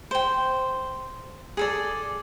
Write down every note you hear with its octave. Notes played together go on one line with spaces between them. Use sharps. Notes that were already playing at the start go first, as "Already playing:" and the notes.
C5 G5
G#4 A4 D5